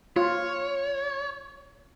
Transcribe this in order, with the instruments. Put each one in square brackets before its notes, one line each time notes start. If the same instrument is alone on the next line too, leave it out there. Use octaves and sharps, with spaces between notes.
[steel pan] F4 [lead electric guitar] C#5